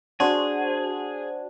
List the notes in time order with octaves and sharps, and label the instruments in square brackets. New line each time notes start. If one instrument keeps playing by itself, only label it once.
[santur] D4 [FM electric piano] F#4 C5 F#5 [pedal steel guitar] G#4